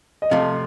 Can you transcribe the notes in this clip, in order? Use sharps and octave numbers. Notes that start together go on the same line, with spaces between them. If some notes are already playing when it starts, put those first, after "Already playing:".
D#5
C3 F3 A3 F5